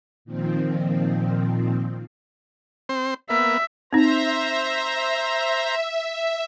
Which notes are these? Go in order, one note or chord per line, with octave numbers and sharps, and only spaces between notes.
A#2 D#3 F3 C4
C4 C5
A#3 B3 E5
C4 D#4 C5 E5 A#5